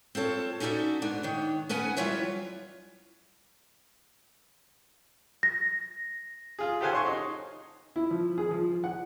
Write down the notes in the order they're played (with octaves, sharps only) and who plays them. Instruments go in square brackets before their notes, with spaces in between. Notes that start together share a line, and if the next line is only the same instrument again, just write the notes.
[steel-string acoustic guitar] C4 F4 A4 C#5
C#4 D#4 F#4 A4 D5 E5
G#2 B3 D4
D#3 C#5
B3 C#4 B4 F#5 G#5
F#3 G3 E4 F4 C#5 E5
[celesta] A#6
[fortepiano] F4 G#4
G4 A4 C5 F5 F#5 G#5
C#5 C6 C#6
D#4
E4
F3
G#4
F3
F#5